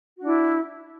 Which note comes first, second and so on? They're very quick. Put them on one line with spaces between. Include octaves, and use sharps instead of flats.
F#4 D4 E4